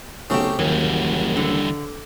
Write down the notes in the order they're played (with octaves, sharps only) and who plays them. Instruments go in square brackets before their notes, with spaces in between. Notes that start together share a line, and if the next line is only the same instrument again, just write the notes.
[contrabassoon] B1 [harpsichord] C#3 A3 [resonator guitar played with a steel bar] C4 G4
[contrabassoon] F#1 [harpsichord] D#2 [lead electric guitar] E3 G3 [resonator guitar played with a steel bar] F#3
[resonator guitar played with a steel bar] D3